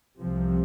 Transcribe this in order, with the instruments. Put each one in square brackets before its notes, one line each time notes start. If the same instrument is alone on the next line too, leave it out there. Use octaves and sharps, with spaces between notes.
[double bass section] C2 C3 F3